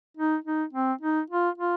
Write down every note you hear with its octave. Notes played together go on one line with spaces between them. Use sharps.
D#4
D#4
C4
D#4
F4
F4